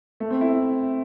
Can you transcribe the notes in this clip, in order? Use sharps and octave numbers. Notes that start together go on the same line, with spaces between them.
A3
C4
E4